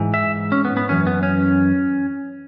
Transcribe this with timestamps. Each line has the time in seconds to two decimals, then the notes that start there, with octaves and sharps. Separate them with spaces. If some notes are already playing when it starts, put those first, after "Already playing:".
Already playing: G#2 E3
0.14 E5
0.52 C#4
0.65 B3
0.77 B3
0.89 F#2 E3 C#4
1.07 B3
1.23 C#4